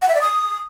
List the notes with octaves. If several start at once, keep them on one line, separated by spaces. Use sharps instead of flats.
F#5
E5
D5
D#6